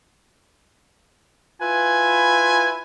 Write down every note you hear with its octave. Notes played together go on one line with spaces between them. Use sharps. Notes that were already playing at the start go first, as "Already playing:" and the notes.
E4 F4 B4 G#5